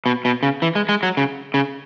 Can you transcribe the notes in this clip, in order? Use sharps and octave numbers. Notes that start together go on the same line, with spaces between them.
B2
B2
C#3
E3
G#3
G#3
F#3
C#3
C#3